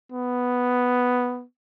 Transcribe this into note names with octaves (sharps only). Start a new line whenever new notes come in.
B3